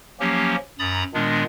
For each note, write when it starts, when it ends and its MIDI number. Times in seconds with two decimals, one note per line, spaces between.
0.20 0.56 53
0.20 0.56 54
0.20 0.56 58
0.20 0.56 61
0.20 0.56 67
0.79 1.03 42
0.79 1.03 82
0.79 1.03 83
0.79 1.03 87
0.79 1.03 93
1.14 1.44 46
1.14 1.44 51
1.14 1.44 56
1.14 1.44 59
1.14 1.44 62